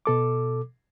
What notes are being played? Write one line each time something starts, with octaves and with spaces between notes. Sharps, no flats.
B2 A4 D6